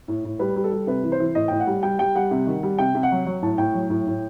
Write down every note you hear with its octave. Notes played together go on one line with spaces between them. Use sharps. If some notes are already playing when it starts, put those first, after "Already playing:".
A2
A2
G3 B4
G3
A4
G3
C3 B4
E3
C5
E3
A2 D#5
A2 G5
F#5
G3
G3 G5
G3 G5
G3 F#5
C3
D#3
G3
C3 G5
C3
F#5
F#3
F#3
A2 A5
A2 G5
F#3
A2
A2